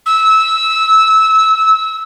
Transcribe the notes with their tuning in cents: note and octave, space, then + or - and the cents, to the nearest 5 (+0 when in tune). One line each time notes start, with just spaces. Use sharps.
E6 -15